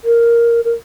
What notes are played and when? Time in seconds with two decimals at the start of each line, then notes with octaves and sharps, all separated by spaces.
0.05 A#4
0.65 A#4